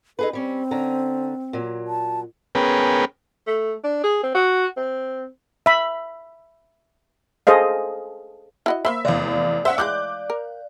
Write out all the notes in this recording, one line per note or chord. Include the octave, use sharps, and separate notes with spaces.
D#4 G#4 A4 B4
G3 C4 C#4
D3 C#4 A#5
A#2 F#3
A5
B3 C#4 G#4 A#4 B4 G5
A3
D4
G#4
C4
F#4
C4
E5 B5
G#4 A4 C5 D#5 F5
E4 F#4 D#5
A#3 C5 E5 B5
F1 E2 D5 F5
C#4 C5 E5 F#5
E3 G3 G#3 D6 F#6 G6
A#4